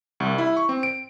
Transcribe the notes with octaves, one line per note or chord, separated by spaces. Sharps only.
C2
E4
C#6
C4
D7